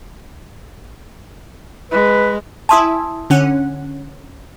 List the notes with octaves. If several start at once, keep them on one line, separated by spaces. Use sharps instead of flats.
G#3 B4
E4 E5 G#5 A5 C6 D#6
D3 C#4 F#5